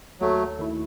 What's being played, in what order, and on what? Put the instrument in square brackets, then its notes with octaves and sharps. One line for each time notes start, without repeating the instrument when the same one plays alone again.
[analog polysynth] D#2 [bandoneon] F#3 A3
[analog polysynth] D#3 A3 E4